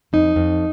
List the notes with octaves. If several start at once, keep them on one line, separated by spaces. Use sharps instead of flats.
F2 D#4
F2